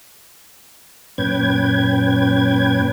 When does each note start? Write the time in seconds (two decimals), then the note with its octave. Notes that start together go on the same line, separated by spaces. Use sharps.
1.18 F#2 A#2 C#4 B4 G5 G#6